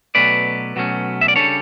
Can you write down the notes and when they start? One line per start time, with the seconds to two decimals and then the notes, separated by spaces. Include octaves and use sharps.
0.15 B2 F#3 A3 C#4 B4 D5
0.76 B2 F#3 A3 C#4
1.21 E5
1.28 D5
1.36 C#3 G3 D4 A4 C#5